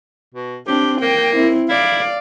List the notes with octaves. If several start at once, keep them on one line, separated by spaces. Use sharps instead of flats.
B2
C4 D4 G4
A#3 G5
C4 E4
E4 D5 F5